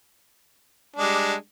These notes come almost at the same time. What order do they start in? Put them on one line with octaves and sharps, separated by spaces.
D4 G#3 G3